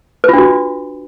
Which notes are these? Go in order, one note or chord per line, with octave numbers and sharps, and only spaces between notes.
D4 F4 F#4 B4